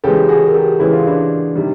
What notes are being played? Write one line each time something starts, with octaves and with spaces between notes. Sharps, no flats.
C#3 E3 G#3 G4 A4
F#4 G#4
A#4
G4 A4
C#3 E3 G#3 E4
F4
D4 E4
C3 D#3 G3